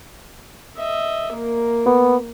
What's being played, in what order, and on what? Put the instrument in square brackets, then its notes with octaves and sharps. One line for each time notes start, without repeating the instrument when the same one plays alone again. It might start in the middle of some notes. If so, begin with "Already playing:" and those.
[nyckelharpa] D#5 E5
A#3 A#4
[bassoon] B3